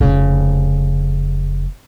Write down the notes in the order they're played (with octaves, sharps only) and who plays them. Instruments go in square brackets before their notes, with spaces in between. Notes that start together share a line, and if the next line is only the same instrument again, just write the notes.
[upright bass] F1 C#3